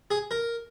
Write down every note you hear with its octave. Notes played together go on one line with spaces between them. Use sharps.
G#4
A#4